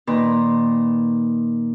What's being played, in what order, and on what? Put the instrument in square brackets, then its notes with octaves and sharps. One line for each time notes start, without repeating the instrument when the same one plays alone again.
[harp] A#2 D#3 B4 A#5